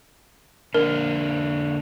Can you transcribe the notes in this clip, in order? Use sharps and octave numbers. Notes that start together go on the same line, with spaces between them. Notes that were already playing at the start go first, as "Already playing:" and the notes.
D3 A#3 D4 A#4